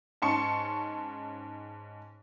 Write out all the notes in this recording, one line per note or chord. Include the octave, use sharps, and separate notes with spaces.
G#2 C#4 A5 C6 C#6 C#7